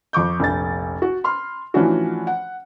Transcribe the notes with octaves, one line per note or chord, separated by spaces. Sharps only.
F2 C#6 D6 G6
F1 A#1 A6
F#4
B5 C6 F6
A2 E3 F3 C#4 D4 F#4
F#5